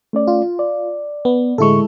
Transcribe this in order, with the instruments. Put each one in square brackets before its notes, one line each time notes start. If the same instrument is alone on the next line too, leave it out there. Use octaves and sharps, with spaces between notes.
[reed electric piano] A3 C#4 D5
[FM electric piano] F4
[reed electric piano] D5
[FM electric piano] B3
[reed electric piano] A2 D3 C#6 [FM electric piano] G#3 E4 A4